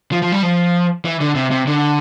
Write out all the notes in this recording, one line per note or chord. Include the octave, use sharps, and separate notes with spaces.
F3
F3
G3
F3
E3
D3
C3
C3
D3